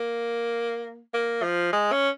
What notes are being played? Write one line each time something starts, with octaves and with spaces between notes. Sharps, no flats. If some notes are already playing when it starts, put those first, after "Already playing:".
Already playing: A#3
A#3
F3
G#3
C#4